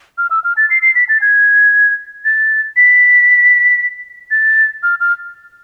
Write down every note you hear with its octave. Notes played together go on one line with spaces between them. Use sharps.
F6
E6
F6
A6
C7
C7
B6
A6
G#6
A6
B6
A6
F6
F6